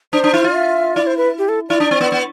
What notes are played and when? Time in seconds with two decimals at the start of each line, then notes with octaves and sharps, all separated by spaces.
0.13 D4 C5
0.24 D4
0.34 E4
0.44 F4
0.55 E5
0.96 E4 D5
1.07 C5
1.17 B4
1.38 G4
1.49 A4
1.69 E4 D5
1.80 D4
1.91 C4
2.01 B3
2.12 B3